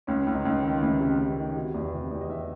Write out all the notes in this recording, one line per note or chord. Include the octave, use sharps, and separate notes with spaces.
C#2 C#4
C#2
D#4
C#2
D#3 C#4
C#2 E4
C3
C#2
D#3
C3 F#4
E2
C3
E2
D#5
E2 E5